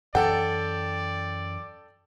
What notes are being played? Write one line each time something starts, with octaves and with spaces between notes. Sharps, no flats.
F#2 E3 A4 D5 F#5 G5